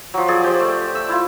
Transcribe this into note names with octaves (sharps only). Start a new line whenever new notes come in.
F3 F#3
G#4 D5
G4 C5 D5
A3
E6
E4 F4